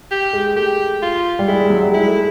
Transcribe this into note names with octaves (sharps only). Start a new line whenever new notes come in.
G4
G#3
A3 G4
F4
G3
G#3 E4
G3
F#3
G3
G#3 E4
A3